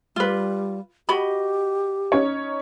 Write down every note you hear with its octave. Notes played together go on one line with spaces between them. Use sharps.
G3 F4 B4
F#4 G4 D#5 B5
C#4 D#4 C#5